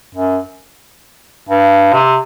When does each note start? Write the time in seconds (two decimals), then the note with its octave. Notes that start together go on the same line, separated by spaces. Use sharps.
0.15 F#2
1.49 G2
1.93 C3